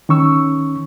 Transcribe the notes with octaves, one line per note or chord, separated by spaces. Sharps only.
D#3 C#4 C#6 E6